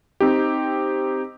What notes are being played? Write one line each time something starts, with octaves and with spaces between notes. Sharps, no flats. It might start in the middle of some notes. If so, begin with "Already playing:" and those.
C4 D#4 G4